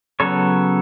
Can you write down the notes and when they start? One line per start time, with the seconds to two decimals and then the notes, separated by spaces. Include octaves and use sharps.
0.20 C#3 F#3 B3 A4 C#5